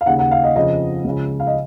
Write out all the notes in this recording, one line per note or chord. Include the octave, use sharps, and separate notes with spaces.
F5
D#2 C#3 F#5
F#5
F5
D#5
F2 C#3 D#5
C#2 C#3
F5
D#5